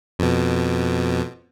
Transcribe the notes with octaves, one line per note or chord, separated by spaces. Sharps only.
F2 B2